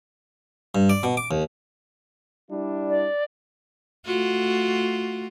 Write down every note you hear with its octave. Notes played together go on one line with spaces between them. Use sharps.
G2
D5
B2
D6
D#2
G3 D4 E4
D5
A3 F4 F#4